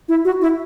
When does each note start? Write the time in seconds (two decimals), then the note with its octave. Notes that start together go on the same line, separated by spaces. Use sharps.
0.09 E4
0.25 F#4
0.41 E4